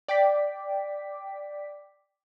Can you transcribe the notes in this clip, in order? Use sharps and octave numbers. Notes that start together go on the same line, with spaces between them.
D5 G5 D6 B6